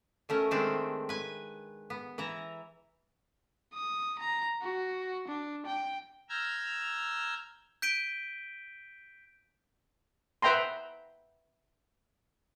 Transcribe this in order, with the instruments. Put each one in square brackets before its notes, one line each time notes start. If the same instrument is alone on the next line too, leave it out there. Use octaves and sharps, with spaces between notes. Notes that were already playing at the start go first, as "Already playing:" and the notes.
[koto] B2 A3 C#4 A#4
D#3 G#3 A3 C4 D4
B4 G#5
B3
E3 E4 A#5
[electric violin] D#6
A#5
F#4
D4
G5
[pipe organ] A#5 E6 F6 G6 G#6
[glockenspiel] G6 B6 D7 D#7 G7
[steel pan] B4 E5 G5 A#5 C6